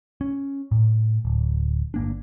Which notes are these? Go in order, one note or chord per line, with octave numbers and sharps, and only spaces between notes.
C#4
A2
D1
G1 A#3 D4